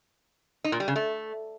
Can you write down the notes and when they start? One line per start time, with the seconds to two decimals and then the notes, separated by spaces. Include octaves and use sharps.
0.64 D#4
0.72 A#2
0.80 G3
0.88 C#3
0.96 A3